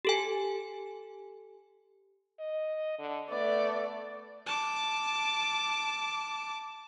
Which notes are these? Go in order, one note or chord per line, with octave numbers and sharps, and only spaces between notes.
G4 A4 G#5
D#5
D3
A3 B3 D5
A5 D6